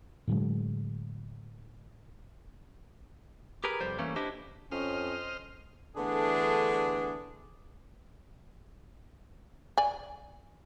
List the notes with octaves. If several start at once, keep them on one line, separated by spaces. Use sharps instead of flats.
A2 D3 F#3 G#3
G4 G#4 A#4 B4
C2 F2 G3 C5
E3 G3 A3 A#3 C#4
D4 E4 G4 C5 D#5
F2 C#4 C5 D#5 F6
D3 E3 A3 B3 D4 G#4
D5 G#5